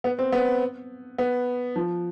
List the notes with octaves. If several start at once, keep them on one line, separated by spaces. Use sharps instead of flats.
B3
C4
B3
B3
F3